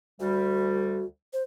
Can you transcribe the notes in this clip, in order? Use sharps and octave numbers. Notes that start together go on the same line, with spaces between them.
D2 G3 F#4
C5